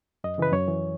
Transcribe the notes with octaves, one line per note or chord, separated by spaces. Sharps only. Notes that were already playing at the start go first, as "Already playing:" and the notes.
F#2 D#5
C#3 E3 B4
F#2 C#5
E3